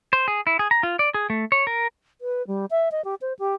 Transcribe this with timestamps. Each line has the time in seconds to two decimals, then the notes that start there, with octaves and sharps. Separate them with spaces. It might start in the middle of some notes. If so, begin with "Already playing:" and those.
0.13 C5
0.28 G#4
0.47 E4
0.59 G#4
0.71 A#5
0.83 F4
0.99 D5
1.14 G#4
1.30 A3
1.52 C#5
1.67 A#4
2.21 B4
2.47 G3
2.71 E5
2.92 D#5
3.05 G4
3.21 C5
3.39 G4